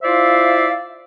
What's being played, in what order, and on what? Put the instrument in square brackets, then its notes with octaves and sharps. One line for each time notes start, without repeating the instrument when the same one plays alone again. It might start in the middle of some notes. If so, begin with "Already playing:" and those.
[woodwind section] E4 F4 C5 D5 E5 F5